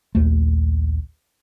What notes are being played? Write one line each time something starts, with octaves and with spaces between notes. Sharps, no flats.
A#1 D#2 A3